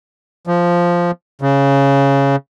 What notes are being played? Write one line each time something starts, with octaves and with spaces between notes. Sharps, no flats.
F3
C#3